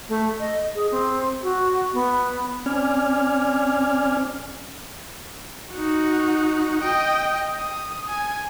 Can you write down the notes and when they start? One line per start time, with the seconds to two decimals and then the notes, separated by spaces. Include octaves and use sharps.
0.09 A3
0.40 D#5
0.75 G#4
0.91 C4
1.43 F#4
1.93 B3
2.66 C4 C#4 D5 G#5 F6
5.74 D#4 F#4
6.82 D#5 G5
7.54 D#6
8.09 G#5